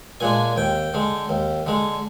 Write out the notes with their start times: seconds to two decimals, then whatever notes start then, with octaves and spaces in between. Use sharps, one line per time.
0.20 A#2 G#3 D4 G#5
0.56 D#2 G5
0.94 D3 G#3
1.29 D#2
1.67 D3 G#3